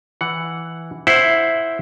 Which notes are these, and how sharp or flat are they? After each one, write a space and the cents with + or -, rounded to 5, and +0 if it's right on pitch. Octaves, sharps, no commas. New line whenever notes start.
E3 +0 F#5 +0
E4 +0 C5 +0 F#5 +0